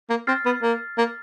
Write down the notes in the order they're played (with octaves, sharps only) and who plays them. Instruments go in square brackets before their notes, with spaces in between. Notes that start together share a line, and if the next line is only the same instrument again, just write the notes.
[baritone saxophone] A#3
[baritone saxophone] C4 [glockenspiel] F6 A6 C7
[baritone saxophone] B3
A#3
A#3